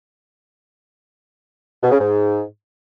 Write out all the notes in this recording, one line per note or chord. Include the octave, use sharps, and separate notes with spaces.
B2
C#3
G#2